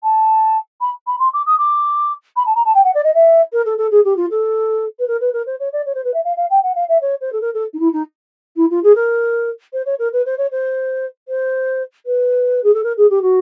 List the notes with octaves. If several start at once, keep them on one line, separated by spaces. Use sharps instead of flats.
A5
B5
B5
C6
D6
D#6
D6
B5
A5
A#5
A5
G5
F#5
D5
D#5
E5
A#4
A4
A4
G#4
G4
F4
A4
B4
A#4
B4
A#4
C5
C#5
D5
C#5
C5
B4
E5
F5
F5
G5
F#5
F5
E5
C#5
C5
A4
A#4
A4
D#4
E4
D#4
E4
F4
G#4
A#4
C5
C#5
A#4
B4
C5
C#5
C5
C5
B4
G#4
A4
A#4
G#4
G4
F#4